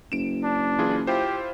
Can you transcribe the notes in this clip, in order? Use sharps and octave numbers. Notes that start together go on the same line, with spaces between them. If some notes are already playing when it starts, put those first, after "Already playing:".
F#1 D7 E7
D4
E3 F4 G#4
E4 F4 G4 C5